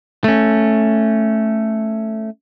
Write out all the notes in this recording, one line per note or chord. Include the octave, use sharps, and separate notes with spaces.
A3 C#4